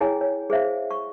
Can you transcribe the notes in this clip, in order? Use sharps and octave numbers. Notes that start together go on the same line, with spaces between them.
E4 G#4 C#5 G5 G#5
C#5
G#4 C5 E5 F5
C#6